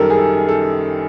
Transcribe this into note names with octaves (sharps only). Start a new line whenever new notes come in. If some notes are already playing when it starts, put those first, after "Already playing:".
Already playing: F#2 D#3 G3 A4 A#4
G#4
A4
A4